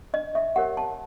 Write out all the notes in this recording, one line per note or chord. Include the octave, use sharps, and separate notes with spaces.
D4 D#5
E5
G4 A#4 C#5 F#5
A5